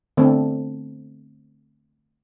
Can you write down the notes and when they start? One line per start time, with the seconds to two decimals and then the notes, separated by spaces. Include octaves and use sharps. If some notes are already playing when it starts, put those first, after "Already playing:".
0.17 D3 A3 B3 C4